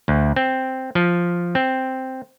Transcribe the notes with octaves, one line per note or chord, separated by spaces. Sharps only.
D2
C4
F3
C4